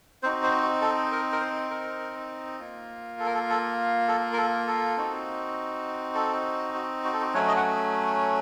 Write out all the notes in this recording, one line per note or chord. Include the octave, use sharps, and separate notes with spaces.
C4 D#4 F#4 C5
C5
F#4
A4
A#4
A#4
C5
A#4
A#3 F4
A4
A#4
A4
A4
A4
A#4
A4
A4
C4 D#4 F#4
A4
F#4
F#4
A4
F#4
F#3 A3 C#4 C#5
D#5
F#5